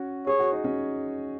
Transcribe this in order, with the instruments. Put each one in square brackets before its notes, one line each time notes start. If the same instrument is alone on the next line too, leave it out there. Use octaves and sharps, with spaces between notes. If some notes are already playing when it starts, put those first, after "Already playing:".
Already playing: [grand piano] C#4 F#4
[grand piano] G#4 [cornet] C#5
[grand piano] F#4
D#4
C#4 F#4